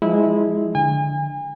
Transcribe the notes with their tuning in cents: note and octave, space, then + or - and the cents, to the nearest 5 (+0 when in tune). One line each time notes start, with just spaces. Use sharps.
F3 +0 G#3 +0 E4 -20
D3 +0 G#5 -40